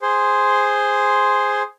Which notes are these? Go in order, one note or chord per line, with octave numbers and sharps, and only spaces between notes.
G#4 C5 C6